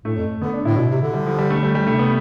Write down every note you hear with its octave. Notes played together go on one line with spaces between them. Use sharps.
A2 A3
F2
D3 B3
D4
A2 E4
B2
C3
D3
G3
F3
G3
A3
G3
G3
C3 A3
B3